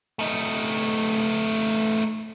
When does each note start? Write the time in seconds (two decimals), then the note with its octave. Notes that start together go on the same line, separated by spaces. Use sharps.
0.19 A3 D#4